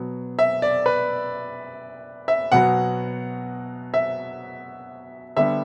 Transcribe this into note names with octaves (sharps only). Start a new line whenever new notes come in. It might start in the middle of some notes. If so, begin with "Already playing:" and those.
Already playing: B2 F#3 B3
E5
D5
B4
E5
B2 F#3 B3 F#5
E5
D3 G3 B3 E5